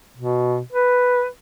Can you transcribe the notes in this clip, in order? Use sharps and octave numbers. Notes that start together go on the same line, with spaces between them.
B2
B4